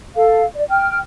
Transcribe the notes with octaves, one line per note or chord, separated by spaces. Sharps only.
A4 F5
D5
G5 F6